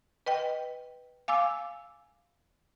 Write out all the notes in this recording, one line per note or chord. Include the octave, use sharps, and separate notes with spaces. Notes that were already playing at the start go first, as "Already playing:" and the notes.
B4 D#5 G5
F5 G#5 D6 E6